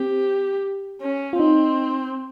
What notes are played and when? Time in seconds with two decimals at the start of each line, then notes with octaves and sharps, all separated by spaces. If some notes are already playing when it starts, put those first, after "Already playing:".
Already playing: C4 G4
1.01 C#4
1.33 F4
1.39 C4 D#4